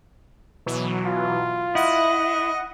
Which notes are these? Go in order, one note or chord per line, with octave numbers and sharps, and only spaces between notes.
B2 E3 F#3
F4
E4 D#5 F#5